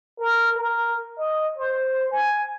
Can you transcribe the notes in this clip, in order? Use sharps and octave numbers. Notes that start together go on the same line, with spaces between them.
A#4
A#4
D#5
C5
G#5